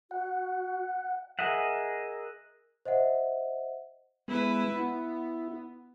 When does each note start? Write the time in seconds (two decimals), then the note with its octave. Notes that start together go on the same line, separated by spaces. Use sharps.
0.11 F#4 F#5
1.39 G#4 A#4 D#5 E5 F#5
2.85 C5 D#5 E5 F#5
4.28 G#3 B3 E4 B4
4.76 B3 E4